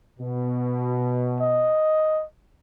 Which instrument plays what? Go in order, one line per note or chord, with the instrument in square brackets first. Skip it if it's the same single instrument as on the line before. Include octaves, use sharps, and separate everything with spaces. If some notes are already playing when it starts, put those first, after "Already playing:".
[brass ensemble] B2
[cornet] D#5